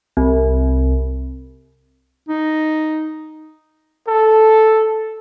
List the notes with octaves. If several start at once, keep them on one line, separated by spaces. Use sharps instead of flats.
C2
D#4
A4